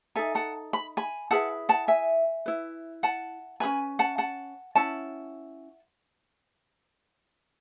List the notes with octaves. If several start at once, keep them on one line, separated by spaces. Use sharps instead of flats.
D#4 A4 E5 G#5
F#5 A5
B5
G#5 B5
E4 G#4 B4 F#5 A5
F#5 A5
E5 G#5
E4 B4
F#5 A5
C#4 G#4 B4 G#5 B5
F#5 A5
F#5 A5
C#4 E4 F#5 A5